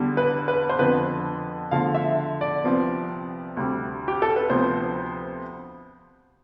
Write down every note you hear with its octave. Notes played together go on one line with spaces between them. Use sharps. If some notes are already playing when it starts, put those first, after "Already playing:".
Already playing: E2 D3 G3
B4
B4
C5
F2 D3 F3 B3 B4
E2 D3 F3 A3 F5
E5
D5
C2 C3 F3 B3
D2 C3 G3
G4
A4
B4
D2 C3 F3 B3 C5